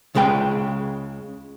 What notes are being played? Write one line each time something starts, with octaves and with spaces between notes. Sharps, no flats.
C#2 C#3 G#3 B4 G5